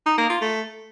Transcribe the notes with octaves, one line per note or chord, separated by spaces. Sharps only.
D#4
A#3
F4
A3